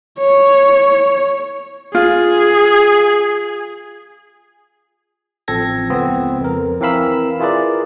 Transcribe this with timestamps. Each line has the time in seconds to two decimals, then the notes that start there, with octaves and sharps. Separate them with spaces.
0.20 C#5
1.95 F4 G#4
5.48 A1 F3 C4 A4 G#6 A#6
5.90 C#2 B3 C4
6.41 F2 A#4
6.81 E3 C4 A#4 F5 B5 E6
7.40 E4 F4 G#4 A#4 B4 D5